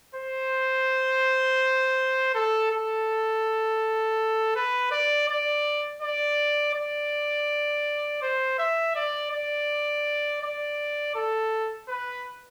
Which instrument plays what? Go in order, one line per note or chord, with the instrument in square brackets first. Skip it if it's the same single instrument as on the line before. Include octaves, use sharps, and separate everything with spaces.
[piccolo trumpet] C5
A4
A4
B4
D5
D5
D5
D5
C5
E5
D5
D5
D5
A4
B4